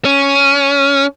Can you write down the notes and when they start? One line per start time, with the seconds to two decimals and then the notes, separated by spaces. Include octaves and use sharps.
0.05 C#4